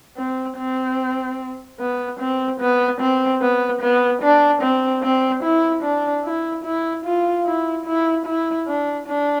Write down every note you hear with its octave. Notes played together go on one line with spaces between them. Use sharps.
C4
C4
B3
C4
B3
C4
B3
B3
D4
C4
C4
E4
D4
E4
E4
F4
E4
E4
E4
D4
D4